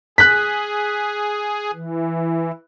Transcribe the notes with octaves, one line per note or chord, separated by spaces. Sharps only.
G#4 F#6 B6
E3